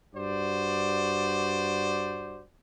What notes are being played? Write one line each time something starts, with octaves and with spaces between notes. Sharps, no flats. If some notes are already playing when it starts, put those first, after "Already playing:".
G2 F#4 C5 D5